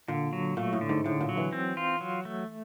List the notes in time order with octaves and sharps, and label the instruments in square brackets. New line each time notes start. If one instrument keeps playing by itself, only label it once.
[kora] A#2 [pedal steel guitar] D3
[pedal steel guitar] F#3
[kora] A#2 [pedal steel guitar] A3
[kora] A2
[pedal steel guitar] D3
[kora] G#2
[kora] A2 [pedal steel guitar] D3
[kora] A#2
[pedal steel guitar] F#3
[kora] E3
[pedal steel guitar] C4
F4
F#3
A3